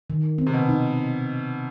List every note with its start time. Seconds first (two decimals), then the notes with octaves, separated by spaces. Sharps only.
0.10 D#3
0.38 C4
0.47 C3
0.53 B2
0.69 D#4